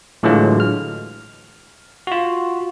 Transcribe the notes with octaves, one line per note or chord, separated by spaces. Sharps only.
A2 D3 E3 F#3 G#3 F4
F6
F4 F#4